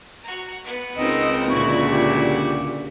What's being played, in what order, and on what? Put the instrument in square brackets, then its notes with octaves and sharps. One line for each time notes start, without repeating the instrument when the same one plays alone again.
[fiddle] F#4 A#5
B3 F#5
[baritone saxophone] C#2 [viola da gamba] C4 D#4 A#4 [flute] D#5
[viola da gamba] A#2 D3 [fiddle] E4 F#4 [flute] C#6
[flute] G4